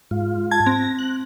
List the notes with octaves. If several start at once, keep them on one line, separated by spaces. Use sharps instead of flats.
G#2 F4
A5 G#6
C4 A#6
F#6